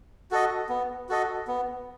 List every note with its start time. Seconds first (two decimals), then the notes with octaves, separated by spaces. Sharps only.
0.31 F#4 A4 D#5
0.69 B3
1.09 F#4 A4 D#5
1.48 B3